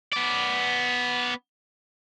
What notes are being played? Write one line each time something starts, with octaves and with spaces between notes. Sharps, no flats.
B3 D5